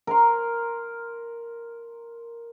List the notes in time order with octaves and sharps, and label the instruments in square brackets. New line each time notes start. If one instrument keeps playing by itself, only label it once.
[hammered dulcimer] A#4 A#5 C6